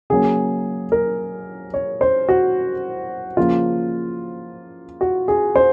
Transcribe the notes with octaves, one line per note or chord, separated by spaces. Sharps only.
C#3 F#3 A#3 G#4
A#4
C#5
C5
F#4
C#3 F3 A#3 F4
F#4
G#4
C5